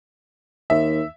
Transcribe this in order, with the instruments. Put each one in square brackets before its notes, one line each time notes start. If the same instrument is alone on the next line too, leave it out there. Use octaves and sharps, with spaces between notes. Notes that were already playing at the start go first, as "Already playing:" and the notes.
[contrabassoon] D#2 [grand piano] E5